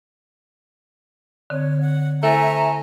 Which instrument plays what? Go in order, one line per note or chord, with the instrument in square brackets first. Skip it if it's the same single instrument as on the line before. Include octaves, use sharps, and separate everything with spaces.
[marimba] D3 C4 [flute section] C#5
[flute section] F#5
[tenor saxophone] A3 [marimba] E4 A4 C5 [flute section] E5 G#5 A#5